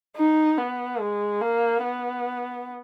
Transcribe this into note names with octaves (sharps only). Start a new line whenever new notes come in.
D#4
B3
G#3
A#3
B3